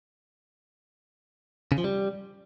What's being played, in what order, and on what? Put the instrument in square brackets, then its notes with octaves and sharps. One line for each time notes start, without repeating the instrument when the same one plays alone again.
[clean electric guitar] C#3
F3
G3